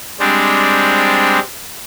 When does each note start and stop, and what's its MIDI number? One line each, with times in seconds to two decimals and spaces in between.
0.19 1.39 55
0.19 1.39 56
0.19 1.39 60
0.19 1.39 62